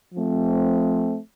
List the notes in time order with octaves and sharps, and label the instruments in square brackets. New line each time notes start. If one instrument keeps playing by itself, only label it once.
[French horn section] F3 A3 C4